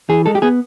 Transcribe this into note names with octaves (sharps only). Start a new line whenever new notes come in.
E3 G#4
G#3 A4
G4
B3 G#4